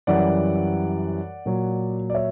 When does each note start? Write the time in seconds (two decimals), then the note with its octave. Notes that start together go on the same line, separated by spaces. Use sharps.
0.07 F#2 E3 G3 D5 F#5
1.46 A#2 F#3
2.10 D5
2.14 C#5 E5